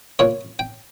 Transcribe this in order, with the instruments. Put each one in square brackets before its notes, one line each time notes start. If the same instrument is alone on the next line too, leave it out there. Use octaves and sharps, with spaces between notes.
[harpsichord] A#2 C#5
G5